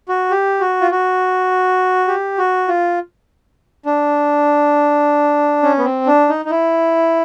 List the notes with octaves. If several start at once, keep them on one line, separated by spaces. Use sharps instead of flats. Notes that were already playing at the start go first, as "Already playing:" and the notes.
F#4
G4
F#4
F4
F#4
G4
F#4
F4
D4
C#4
B3
C4
D4
D#4
D#4
E4